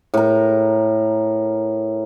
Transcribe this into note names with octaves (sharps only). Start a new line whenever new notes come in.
A2 A#4